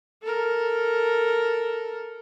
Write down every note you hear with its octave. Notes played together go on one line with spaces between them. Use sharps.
A4 A#4